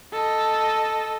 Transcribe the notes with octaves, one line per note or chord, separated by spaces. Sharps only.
A4 D#5